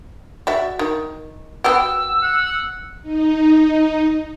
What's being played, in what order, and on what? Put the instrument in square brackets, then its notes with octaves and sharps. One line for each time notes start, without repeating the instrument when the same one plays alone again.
[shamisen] F#4 D5 E5
D#3
[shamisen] B3 F#4 G4 [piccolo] E6
[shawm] F#5
[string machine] D#4